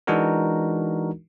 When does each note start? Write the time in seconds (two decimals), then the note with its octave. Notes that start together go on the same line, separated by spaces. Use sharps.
0.07 E3 G#3 D4 D#4 F#4 A#4